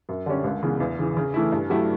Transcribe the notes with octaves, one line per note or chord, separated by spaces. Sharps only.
F#2
D3 G3 C#4 G4
C#2
C#3 E3 B3
E2
C#3 E3
C#3
E3 A3 E4
G2
F#3 A3 E4 G4